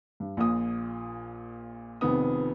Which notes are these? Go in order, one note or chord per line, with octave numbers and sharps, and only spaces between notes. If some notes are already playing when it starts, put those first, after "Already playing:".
G2
A#1 A#2 D#6
F1 F2 D#3 B3 D#6